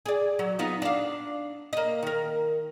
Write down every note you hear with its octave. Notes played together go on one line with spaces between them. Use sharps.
G#4 D5
F#3
B3 D#4 F4
D4 F5
A#3 D#5
D#3 A#4